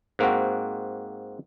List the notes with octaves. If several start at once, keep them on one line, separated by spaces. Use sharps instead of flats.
G#2 A#3 C4 F#4